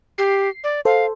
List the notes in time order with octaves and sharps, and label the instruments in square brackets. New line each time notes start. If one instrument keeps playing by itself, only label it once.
[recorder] G4 [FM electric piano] C7
[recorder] D5
[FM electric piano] A4 C5 [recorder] F5